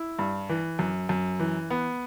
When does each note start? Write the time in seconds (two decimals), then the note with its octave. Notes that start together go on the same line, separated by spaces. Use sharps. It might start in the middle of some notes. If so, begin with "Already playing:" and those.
Already playing: E4
0.19 G2
0.49 E3
0.79 F#2
1.09 F#2
1.39 E3
1.70 B3